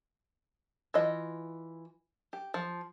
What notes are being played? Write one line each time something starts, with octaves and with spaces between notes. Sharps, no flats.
E3 F4 D#5
G4
F3